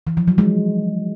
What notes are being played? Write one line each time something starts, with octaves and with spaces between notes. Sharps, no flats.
E3
F3
F#3
G#3